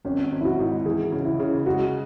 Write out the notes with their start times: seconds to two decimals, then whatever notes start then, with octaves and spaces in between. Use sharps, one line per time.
0.05 G#1 C#4
0.32 G#1
0.41 E4
0.45 F#4
0.59 G#2
0.85 E3 G#4
1.12 C#3
1.25 E4
1.40 C#3
1.66 G#3 F#4